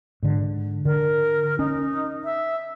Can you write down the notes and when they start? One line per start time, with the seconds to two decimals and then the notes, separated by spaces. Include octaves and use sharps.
0.23 G#2 D3
0.85 D3 A#4
1.59 C#4 D#4
2.24 E5